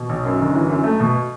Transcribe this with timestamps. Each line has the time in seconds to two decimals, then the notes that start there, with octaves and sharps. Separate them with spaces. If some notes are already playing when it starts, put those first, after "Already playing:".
Already playing: B2
0.09 B1
0.25 F#2
0.40 G1
0.55 E3
0.69 F#2
0.84 A3
1.00 B2